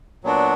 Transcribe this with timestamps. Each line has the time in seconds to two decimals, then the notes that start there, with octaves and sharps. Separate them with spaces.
0.24 A#2 F#3 B3 D4 F#4